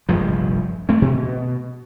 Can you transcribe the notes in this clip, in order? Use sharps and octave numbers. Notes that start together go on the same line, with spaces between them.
F1 A#1 G2 F3
A3 C4
B2